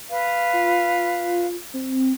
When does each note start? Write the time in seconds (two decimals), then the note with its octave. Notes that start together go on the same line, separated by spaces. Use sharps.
0.09 B4 F5
0.53 F4
1.74 C4